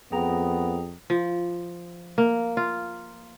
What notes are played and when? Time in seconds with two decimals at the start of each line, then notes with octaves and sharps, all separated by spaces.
0.12 F2 B3 G#4 G5 A#5
1.10 F3
2.18 A#3
2.57 F4